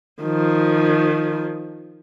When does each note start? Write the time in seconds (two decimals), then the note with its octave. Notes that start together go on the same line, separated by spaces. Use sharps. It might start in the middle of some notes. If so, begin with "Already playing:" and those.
0.22 D#3 F3